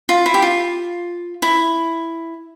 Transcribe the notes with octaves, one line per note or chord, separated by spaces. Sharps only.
F4
E4
G4
F4
E4